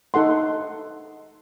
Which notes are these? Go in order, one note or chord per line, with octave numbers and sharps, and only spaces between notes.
D#4 A4 F#5 C6